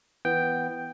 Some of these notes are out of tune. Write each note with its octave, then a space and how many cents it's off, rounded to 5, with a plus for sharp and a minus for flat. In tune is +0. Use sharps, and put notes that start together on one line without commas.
E3 +0 B3 +0 G5 +0